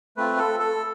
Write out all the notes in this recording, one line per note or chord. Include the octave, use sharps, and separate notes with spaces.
A3 C4 F4 B4
A4
A4